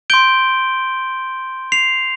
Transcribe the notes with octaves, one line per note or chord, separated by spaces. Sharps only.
C6 G6 D7 G7
C7 F7